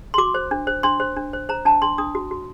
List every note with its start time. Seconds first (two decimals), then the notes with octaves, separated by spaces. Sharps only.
0.14 C6
0.18 F#4 D6
0.34 C5
0.51 D4
0.67 C5
0.83 D4 C6
1.00 C5
1.16 D4
1.33 C5
1.49 C5 A#5
1.65 D4 A5
1.82 D4 C6
1.98 D4 D#6
2.15 F#4
2.31 F#4